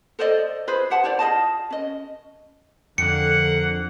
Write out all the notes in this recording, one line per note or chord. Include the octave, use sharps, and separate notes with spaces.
A4 C5 D5 D#5
F4 G#4 B4 C5
G4 C5 F#5 A5
E4 C5 D5
F4 G#4 D#5 A5
C#4 D#5
F2 D3 A#3 F#5 C#7